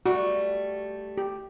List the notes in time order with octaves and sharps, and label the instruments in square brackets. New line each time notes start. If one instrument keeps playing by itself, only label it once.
[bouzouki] G3 A3 [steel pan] F#4
[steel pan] G4